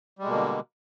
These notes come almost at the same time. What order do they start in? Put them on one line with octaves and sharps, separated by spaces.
G3 G#3 B2 A#3 D3